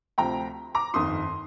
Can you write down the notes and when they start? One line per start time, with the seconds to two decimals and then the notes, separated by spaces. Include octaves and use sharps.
0.18 D2 C3 F3 G5 A#5
0.75 A#5 D6
0.94 G1 F2 D#3 C6 D#6